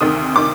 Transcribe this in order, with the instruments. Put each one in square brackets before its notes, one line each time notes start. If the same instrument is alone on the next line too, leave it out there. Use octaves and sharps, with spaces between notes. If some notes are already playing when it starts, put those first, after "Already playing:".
[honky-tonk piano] D2 C3 D#3 D#6
C3 D#3 D6